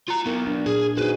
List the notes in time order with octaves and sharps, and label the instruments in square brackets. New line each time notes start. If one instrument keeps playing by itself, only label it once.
[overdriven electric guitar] F4 A#5
[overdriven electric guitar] F#3 B3 [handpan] E4 A#4
[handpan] D4
[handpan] A#2 [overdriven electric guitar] G#4
[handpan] D#4 F#4 G#4 [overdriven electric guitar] B4 C5